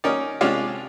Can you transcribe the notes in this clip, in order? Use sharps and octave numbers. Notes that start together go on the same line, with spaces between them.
C#4 D#4 A#4 D5
C3 G#3 C#4 D4 F4